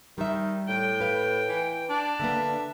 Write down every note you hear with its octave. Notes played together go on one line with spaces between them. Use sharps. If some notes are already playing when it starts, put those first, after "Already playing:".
D#3 G3 E5
A2 G5
B4 F5
E3
D4
D3 A#3 B3 E5